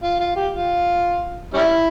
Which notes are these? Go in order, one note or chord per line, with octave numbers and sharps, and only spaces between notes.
F4
F4
G4
F4
G3 C#4 E4